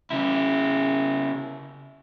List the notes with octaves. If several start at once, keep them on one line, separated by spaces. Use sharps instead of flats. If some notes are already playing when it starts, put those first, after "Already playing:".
C#3 E4